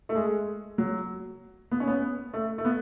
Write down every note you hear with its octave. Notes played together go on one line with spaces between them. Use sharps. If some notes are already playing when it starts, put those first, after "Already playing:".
A3
G#3
F#3
B3
C#4
B3
A3
A3
B3